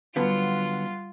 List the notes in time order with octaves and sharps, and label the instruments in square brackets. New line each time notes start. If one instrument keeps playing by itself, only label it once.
[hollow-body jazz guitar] D3 F#3 B3 [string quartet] G3 F#5 [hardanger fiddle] F4